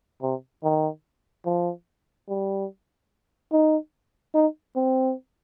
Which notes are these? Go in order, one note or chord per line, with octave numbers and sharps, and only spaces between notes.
C3
D#3
F3
G3
D#4
D#4
C4